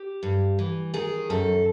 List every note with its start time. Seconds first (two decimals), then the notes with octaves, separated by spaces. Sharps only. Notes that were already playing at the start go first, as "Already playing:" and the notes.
Already playing: G4
0.23 G2
0.59 E3
0.94 D#3 G#4
1.30 F#2 A4